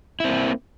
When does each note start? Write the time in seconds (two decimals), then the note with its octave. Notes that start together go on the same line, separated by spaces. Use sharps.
0.20 E4
0.24 C4
0.28 A#3